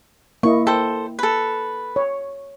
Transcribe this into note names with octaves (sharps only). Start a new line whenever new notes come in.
A#3 E4 D#5 C#6
A4 C5 G5
A4 B4
C#5